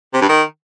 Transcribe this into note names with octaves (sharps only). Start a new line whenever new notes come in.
C3
G2
D#3